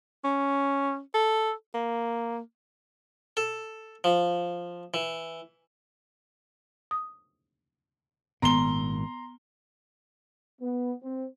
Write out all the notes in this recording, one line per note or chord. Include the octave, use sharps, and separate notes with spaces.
C#4
A4
A#3
A4
F3
E3
D#6
G#1 A#2 B3 A#5 C6 G7
B3
C4